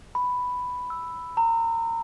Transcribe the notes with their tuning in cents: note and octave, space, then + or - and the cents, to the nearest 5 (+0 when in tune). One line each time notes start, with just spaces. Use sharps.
B5 +5
E6 +0
A#5 -25